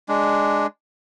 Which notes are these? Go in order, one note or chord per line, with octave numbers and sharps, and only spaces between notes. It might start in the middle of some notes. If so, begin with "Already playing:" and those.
G#3 D4